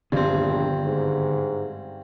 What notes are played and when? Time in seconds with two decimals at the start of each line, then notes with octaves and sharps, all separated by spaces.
0.12 A#1 G2 D3 D#3 B3 C4
0.86 G#2